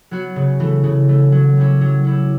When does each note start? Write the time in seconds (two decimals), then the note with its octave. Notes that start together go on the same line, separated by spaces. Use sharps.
0.11 F#3 B3 F#4
0.36 C#3
0.60 E3 A3
0.84 C#3
1.08 E3 A3
1.32 F#3
1.57 C#4 E4 G4
1.81 F#3
2.04 C#4 E4 G4